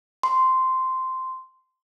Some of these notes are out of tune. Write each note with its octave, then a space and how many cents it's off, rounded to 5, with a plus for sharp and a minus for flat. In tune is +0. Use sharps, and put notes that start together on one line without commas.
C6 -10